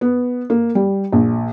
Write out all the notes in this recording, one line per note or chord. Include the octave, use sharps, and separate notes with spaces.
B3
A#3
G3
A#1